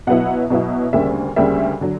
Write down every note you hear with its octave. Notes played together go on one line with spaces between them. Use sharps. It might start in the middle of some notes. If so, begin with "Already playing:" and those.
B2 F#3 B3 E4 F#5
B2 F#3 B3 E4
D2 C#3 G3 A#3 E5
D2 C#3 G3 A#3 E5
D3 F#3